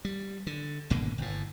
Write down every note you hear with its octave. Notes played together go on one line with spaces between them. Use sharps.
G3
D3
G#1 B2 D3 A#3
G1 A2